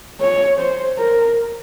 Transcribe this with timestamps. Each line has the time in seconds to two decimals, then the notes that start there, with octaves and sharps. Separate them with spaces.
0.21 C#5
0.59 C5
0.98 A#4